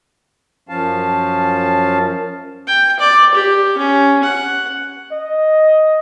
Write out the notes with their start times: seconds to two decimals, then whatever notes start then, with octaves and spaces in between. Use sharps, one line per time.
0.69 F#2 F3 C#4 F5 A5
2.67 G5
3.00 D5
3.34 G4
3.78 C#4
4.23 F#5
5.12 D#5